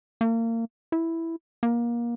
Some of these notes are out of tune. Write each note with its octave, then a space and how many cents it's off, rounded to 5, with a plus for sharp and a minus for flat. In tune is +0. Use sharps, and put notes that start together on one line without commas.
A#3 -30
E4 +0
A#3 +25